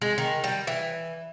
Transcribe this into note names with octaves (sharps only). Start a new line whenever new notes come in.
G#3
D#3
G3
E3